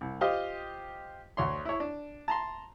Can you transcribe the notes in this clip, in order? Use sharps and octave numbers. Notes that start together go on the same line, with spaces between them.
C2
F4 G4 C5 D#5 F5
D2 C#5 C6
E4 C#5
D4
A5 A#5 C6